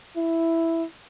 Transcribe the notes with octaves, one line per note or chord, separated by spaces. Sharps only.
E4